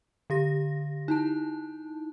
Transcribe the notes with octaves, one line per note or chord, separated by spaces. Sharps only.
D3 G4 A#6
D#4 E4 A5